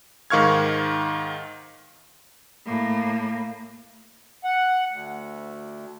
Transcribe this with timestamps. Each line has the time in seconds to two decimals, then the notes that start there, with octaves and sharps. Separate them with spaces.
0.30 G#2 D#3 F5 C#6 F6 G#6
2.66 A2 A#3
4.44 F#5
4.90 D2